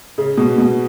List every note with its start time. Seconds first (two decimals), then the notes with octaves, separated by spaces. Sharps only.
0.18 C#3
0.37 B2
0.58 B2